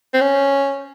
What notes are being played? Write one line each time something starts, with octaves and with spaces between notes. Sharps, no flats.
C4
C#4